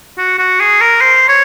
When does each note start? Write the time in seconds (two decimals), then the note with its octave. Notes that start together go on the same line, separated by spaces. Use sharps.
0.18 F#4
0.39 F#4
0.60 G#4
0.81 A#4
1.01 C5
1.29 C#5